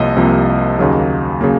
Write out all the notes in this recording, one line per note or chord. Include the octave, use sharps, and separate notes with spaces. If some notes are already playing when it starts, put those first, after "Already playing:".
Already playing: C2 C3 F3 A#3 C#5 D#5
C2 C3 F3 A#3
D#2 C#3 F#3 A#3
C#3 F#3 A#3